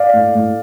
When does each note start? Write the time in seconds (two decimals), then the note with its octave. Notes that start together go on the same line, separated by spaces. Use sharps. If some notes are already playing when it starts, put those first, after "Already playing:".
Already playing: D5 F5
0.14 A2
0.35 A2